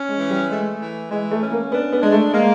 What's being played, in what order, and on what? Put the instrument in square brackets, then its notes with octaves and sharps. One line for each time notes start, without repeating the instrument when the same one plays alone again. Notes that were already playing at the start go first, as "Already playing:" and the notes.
Already playing: [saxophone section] C#4
[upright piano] G#3
[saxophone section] E3
[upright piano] G3
[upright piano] G#3 [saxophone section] A3
[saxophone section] E3
[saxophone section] E3 [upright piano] G#3
[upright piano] A3
[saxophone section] C#4
[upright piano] A#3
[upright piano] B3 [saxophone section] D4
[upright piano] B3
[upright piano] G#3 [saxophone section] D4
[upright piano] A3
[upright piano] G#3 [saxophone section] A#3